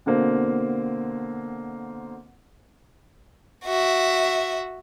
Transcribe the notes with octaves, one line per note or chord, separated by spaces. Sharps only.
B2 D3 A#3 C4
F#4 E5